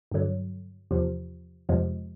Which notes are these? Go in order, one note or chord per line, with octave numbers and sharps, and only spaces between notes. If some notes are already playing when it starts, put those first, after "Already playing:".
G2 D3 F#3
E2 C3 F3
F2 C3 F3 G#3